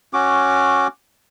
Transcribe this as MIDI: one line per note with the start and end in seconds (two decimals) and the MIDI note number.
0.13 0.87 61
0.13 0.87 66
0.13 0.87 86